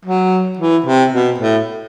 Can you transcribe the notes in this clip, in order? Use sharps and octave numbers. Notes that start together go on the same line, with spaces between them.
F#3
E3
C3
B2
A2